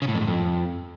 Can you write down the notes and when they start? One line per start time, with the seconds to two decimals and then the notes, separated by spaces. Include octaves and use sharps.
0.02 C#3
0.08 A2
0.15 F2
0.21 G#2
0.27 F2